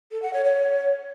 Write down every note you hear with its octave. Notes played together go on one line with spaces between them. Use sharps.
A4
F#5
C#5
C#5